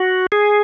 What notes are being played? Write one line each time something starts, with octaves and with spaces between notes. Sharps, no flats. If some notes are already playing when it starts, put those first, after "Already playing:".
Already playing: F#4
G#4